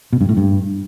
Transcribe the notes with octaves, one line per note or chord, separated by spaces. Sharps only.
B2
G2
A2
G2